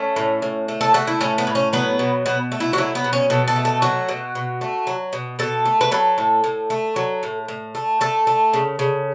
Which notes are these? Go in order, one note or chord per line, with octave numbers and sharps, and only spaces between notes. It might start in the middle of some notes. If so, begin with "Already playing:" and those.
Already playing: A3 C#4
A2
A2
A3
A4
A3 F#4
E4
A2 C#4
B3
A2
C#4
F#3 B3
B2
B2 B3
A3
E4
F#4
F#3 E4
B3
B2
C#4
B2 A4
A4
A3
A4
F#3 F#4
B2
B2
A3
F#3
B2
B2 A4
A3
B4
F#3 A4
A2
A2
A3
F#3
A2
A2
A3
A3 A4
A3
C#3
C#3